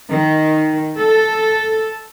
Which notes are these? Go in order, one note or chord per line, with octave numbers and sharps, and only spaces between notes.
D#3
A4